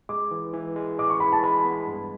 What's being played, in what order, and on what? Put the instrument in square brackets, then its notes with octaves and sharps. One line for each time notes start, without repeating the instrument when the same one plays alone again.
[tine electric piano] G#3 [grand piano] D6
[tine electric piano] E3
E3
G#3
[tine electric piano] G#3 [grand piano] D6
[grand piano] C#6
[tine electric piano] E3 [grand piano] B5
[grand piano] A5
[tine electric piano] G#3 [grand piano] B5
[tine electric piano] B3
G2